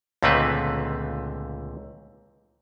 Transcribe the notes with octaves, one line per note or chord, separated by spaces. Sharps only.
C#2 A#2 D3 A3 C4 B4